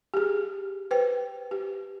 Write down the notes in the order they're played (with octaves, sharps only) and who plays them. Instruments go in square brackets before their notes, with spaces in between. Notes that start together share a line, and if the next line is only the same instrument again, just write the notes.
[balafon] G4 G#4
B4 C5 G5
G4